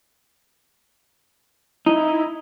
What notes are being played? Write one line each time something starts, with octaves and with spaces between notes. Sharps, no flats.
D#4 E4